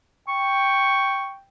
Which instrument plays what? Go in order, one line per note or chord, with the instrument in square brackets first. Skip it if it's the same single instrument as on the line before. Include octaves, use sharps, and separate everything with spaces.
[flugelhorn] G5 [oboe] C#6